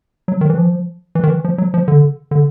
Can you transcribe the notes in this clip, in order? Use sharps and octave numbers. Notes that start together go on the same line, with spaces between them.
F#3
D#3
E3
F3
E3
D#3
E3
F3
F#3
F3
D3
D3